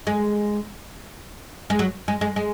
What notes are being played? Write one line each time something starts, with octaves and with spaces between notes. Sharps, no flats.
G#3
G#3
F#3
G#3
G#3
G#3